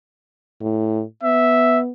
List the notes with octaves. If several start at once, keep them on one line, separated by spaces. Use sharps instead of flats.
A2
B3 E5